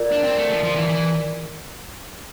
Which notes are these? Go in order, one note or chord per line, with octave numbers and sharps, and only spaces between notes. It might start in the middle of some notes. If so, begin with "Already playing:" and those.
Already playing: F4 A#4 D5
D4
C4
A3
F3
F3
E3
E3